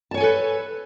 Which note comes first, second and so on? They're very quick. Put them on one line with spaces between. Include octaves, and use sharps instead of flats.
A5 C#5 G#5 A4 B4